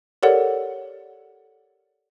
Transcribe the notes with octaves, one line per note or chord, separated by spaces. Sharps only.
G4 A4 A#4 C#5 D5 F#5